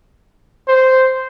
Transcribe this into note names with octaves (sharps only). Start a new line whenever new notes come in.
C5